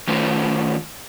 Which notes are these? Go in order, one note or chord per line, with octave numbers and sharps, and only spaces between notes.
D#3 A3 C#4 F4 B4 C5